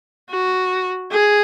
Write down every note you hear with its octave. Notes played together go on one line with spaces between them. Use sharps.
F#4
G#4